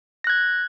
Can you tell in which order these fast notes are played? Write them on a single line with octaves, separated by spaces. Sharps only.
A#6 F#6 G#6